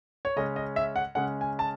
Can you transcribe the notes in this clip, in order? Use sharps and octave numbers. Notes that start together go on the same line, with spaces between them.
C#5
C#3 G#3 C#4 D#5
D#5
E5
F#5
C#3 G#3 C#4 F#5
G#5
A5